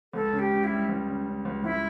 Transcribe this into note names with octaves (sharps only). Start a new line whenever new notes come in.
C#2 A4
C#3
G4
C#3
E4
G3
C#2
C#3
C#3
C#2
C#2 E4